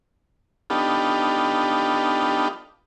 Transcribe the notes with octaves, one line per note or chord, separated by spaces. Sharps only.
B3 D4 D#4 F4 G4 A4